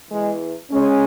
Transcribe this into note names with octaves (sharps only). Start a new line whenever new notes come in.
E2 E3 G#3
G#3 C#4